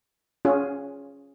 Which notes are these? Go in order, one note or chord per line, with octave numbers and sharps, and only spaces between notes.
C#4 F4 G#4